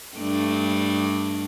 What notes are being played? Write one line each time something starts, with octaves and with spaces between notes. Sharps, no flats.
G2 A3 D4